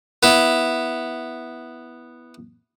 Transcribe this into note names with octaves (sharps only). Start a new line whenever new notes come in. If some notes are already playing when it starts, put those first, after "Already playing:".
B3 E4